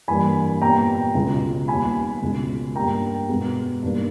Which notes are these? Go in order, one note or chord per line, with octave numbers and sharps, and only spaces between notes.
G2 E3 G3 A#3 G#5 B5
A#2 G3 B3 G5 A#5
C#2 B2 G#3
D#2 D#3 G3 B3 G#5 B5
C#2 B2 G#3
G2 G3 A#3 G5 A#5
B2 G#3 B3
G2 D#3 A#3